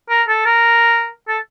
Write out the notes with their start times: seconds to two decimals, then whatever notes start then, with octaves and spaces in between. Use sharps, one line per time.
0.10 A#4
0.28 A4
0.46 A#4
1.28 A4